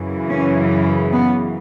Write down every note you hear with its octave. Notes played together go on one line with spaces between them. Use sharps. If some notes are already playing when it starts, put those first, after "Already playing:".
Already playing: F#2 C#3 E3
C#4
B3